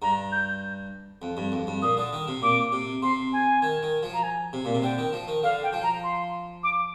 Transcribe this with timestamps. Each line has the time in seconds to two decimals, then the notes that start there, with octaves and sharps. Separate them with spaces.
0.02 G2 A#5
0.32 G6
1.22 F2
1.37 G2
1.52 F2
1.67 G2
1.82 A#2 D#6
1.97 D3
2.13 D#3
2.28 C3
2.42 A#2 D6
2.72 C3
3.02 C3 C6
3.33 G#5
3.62 D#3
3.83 D#3
4.03 F3
4.14 A#5
4.23 G#5
4.53 C3
4.65 A#2
4.75 C3
4.82 D3 G5
4.98 D#3
5.13 F3
5.28 D#3
5.43 D3 F5
5.63 G5
5.73 F3
5.83 A#5
6.03 C6
6.63 D6